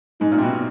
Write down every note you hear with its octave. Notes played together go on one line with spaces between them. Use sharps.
G#2 D#4
A#2
C3
B2